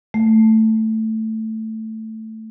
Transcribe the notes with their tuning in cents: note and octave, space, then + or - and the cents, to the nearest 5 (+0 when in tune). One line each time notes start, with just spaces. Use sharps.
A3 +5